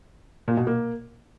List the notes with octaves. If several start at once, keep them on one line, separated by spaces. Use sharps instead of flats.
A#2
B2
A#3